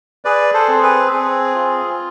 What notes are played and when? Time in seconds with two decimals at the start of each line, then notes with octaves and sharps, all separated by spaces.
0.25 G#4 B4 D5
0.54 A4 C5
0.68 C4 C5
0.83 G#4 B4
1.12 C4 G#4
1.55 F4